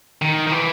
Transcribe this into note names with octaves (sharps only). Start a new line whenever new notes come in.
D#3
D#3
E3